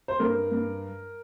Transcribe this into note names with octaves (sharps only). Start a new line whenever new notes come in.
C5
G2 A#4
G2